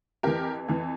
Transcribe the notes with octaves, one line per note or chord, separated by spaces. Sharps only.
F2 E3 G4 A#4
F2 E3